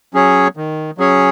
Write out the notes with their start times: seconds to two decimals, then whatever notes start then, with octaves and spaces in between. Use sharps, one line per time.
0.14 F#3 C#4 G#4 C#5
0.57 D#3
0.98 F#3 C#4 G#4 C#5